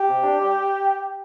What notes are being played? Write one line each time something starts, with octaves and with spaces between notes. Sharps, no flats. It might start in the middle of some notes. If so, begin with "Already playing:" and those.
Already playing: G4
C3
D4
G3